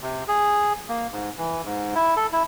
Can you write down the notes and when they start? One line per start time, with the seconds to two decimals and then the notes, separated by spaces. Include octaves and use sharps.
0.02 C3
0.28 G#4
0.89 A#3
1.12 G#2
1.38 E3
1.65 G#2
1.95 E4
2.17 A4
2.33 E4